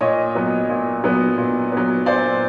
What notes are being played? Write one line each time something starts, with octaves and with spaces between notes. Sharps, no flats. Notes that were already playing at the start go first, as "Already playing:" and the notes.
A#2 C#5 D#5
F#3 B3
A#2
F#3 B3
A#2
F#3 B3
A#2 C5 D5